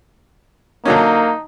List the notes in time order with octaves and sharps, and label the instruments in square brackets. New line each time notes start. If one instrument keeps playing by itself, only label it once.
[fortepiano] D3 F#3 C#4 [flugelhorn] A#3 [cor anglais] D#4